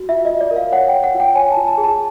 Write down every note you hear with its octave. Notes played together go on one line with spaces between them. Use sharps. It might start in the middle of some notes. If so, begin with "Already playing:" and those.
Already playing: F#4
F4 E5
D#5
F4
D5
A#4
F5
C#5 F#5
G5
C#5
F#5
F4
G5
C#5 G#5
A5
F4
A5
G#4
A5